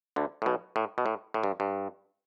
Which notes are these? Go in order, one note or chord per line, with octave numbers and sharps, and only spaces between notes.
D2 D3
A2
B1 B2
A2
B2
A2
A2
G2
G2